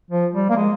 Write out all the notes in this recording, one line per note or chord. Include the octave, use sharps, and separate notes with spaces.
F3
G3
A#3
G#3